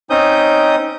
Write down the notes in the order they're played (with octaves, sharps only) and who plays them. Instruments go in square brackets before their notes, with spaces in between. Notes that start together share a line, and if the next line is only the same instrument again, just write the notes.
[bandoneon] C4 C#4 D#4 D#6 G6